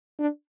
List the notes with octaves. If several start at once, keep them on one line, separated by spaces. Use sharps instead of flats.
D4